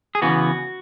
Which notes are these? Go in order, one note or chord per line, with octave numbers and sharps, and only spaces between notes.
G#4
C#3 E3 B3 F#4